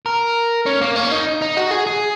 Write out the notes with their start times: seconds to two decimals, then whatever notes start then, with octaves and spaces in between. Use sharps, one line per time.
0.06 A#4
0.66 C#4
0.81 A#3
0.96 C#4
1.11 D#4
1.42 D#4
1.57 F#4
1.71 G#4
1.87 G#4